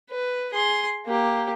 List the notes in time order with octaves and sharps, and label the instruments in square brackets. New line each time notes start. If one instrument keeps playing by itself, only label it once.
[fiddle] B4
G#4 C6
A#3 G4